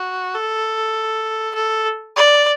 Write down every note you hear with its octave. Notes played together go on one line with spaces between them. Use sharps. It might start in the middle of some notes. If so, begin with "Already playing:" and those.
Already playing: F#4
A4
A4
D5